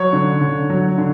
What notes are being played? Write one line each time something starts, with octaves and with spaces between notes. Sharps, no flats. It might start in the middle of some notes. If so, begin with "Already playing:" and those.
Already playing: F#3 C#5
D3
D3
F#3
D3